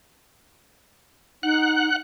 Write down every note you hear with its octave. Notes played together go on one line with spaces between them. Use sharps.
D#4 F#5 F#6